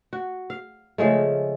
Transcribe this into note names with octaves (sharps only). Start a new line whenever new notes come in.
F#4
F5
C#3 F3 G#3 A3